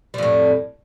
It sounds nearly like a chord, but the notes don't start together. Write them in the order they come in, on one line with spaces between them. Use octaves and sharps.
G3 F2 A2